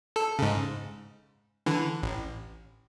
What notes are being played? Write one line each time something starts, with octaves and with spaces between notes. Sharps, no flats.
A4
G#2 C#3
D3 E3
A1